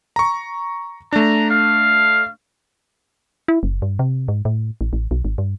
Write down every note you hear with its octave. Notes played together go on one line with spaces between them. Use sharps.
A#5 C#6
A3 D4 A#5
F5
E4
F#1
G2
C3
G#2
A2
A1
A1
B1
G#1
G2